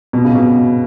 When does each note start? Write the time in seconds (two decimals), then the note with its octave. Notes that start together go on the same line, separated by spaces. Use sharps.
0.13 B2
0.24 C#3
0.35 B2